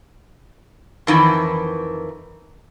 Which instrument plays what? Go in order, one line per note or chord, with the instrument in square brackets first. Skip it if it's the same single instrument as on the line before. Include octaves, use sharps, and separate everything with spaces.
[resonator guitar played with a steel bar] F2 D#3 E3